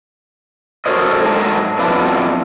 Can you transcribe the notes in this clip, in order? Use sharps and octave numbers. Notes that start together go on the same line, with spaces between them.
F#4 A4 A#4 C5 C#5 D#5
G#2 F#3 A3 D4 D#4 A5
F2 B2 B3 D4 E4 F4